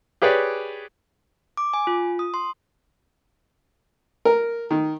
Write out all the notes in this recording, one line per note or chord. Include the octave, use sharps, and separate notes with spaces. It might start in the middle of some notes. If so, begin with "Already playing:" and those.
G4 G#4 B4 C#5 D5
D6
G#5
F4
D#6
C6
A#4
D#3